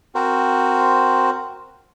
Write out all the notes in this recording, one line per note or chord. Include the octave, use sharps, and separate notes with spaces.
C4 F#4 A#4 C5